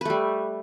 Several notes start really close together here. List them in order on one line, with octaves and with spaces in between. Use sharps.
B4 A3 G3